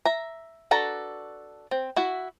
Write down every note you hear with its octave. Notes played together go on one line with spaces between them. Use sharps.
E5 A#5
D4 F#4 A4 B4 A#5
C4
E4 F#4 E5